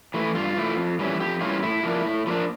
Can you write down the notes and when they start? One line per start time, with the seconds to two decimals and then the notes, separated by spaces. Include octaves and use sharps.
0.14 E3 A3 E4
0.35 G2 F4
0.56 E3 A3 E4
0.78 F2
0.99 E3 G3 C#4 E4
1.20 F2 G4
1.41 E3 G3 C#4 E4 F4
1.62 A2 E4
1.83 F3 A#3 D4
2.05 A2
2.27 F3 A#3 D4